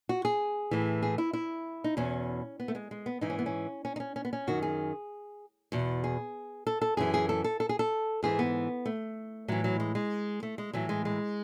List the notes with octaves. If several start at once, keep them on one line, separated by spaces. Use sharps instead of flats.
F#4
G#4
A2 E3
G#4
E4
E4
D#4
E2 B2 C#4
B3
A3
G#3
G#3
B3
G#2 E3 D#4
C#4
B3
C#4
C#4
D#4
C#4
C#4
B3
C#4
F#2 D#3 F#4
G#4
E2 B2
G#4
A4
A4
F#2 E3 G#4
G#4
A4
A4
A4
G#4
A4
G#2 E3 G#4
B3
A3
A2 E3 F#3
F#3
G#3
G#3
A3
G#3
A2 E3 F#3
G#3
G#3